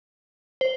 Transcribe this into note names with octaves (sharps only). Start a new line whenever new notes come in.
C5